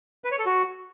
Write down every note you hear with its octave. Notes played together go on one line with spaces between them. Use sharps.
B4
C#5
A4
F#4